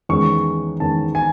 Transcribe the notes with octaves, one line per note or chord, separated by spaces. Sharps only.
E2 D#3 G#3 C#4 C#6
E2 D#3 G#3 C#4 A5
G#5